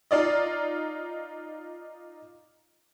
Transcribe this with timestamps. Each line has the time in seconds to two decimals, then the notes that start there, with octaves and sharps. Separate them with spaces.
0.11 D#4 F4 D5 D#5